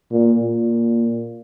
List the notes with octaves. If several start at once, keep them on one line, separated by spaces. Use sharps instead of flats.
A#2
A#2